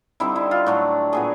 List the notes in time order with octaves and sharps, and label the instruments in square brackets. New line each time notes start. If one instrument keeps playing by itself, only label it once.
[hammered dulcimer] D3 G3 C4 D#4 E4
E4
F4
A2 F#3 A3 D4 F#4
A#2 F#3 B3 G#4